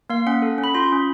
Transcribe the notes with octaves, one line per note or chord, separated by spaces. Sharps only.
A#3 F5
C#4 F#5
A4
C#4
B5
F4 C6
C#4